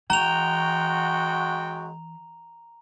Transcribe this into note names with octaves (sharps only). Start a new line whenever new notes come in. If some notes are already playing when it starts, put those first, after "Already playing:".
F#2 E3 G#3 F#4 G5 A#5 F7